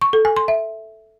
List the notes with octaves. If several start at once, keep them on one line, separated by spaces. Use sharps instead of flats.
C#6
A4
G#5
C6
E5